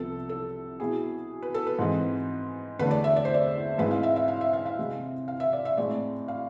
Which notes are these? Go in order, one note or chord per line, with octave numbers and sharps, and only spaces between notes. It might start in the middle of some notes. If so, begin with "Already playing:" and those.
Already playing: C2 C3 F3 B3 A4
A4
B2 B3 E4 G#4
B4
A4
B4
G#2 E3 G#3 C4
E2 D3 A3 D4 B4
D5
E5
D5
C5
D5
G#2 G#3 C4 E4 B4
F5
E5
E5
F5
E5
F5
F5
C3 G#3 C4
F5
E5
D5
E5
A2 G#3 C4 D5
F5